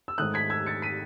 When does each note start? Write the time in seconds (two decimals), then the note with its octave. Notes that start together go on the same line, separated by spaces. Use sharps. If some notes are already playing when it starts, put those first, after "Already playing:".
0.08 E6
0.18 G#2 D#3 A3 D#6 F#6
0.34 G#6 B6
0.50 E6 G#6
0.66 A6 C#7
0.82 B6 D#7